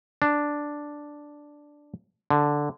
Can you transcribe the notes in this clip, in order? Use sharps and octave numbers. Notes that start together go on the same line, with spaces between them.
D4
D3